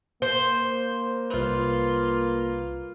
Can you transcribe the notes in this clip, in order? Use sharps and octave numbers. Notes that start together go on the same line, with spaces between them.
A#3 C5
C2 F4 B4